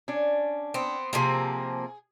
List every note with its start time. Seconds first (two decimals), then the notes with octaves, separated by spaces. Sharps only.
0.08 C#4 D4
0.74 B3 C4
1.13 C3 F3 A#3 G#4